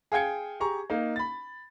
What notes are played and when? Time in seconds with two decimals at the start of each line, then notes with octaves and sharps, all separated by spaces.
0.12 G#4 F5 G5 G#6 C#7
0.60 G4 G#4 A#5 C#6
0.90 A#3 D#4
1.16 B5 A6